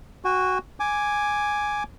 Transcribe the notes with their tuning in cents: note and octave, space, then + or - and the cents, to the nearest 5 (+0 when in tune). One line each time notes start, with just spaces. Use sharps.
F#4 +0 G#5 -40
G#5 +0 D6 +0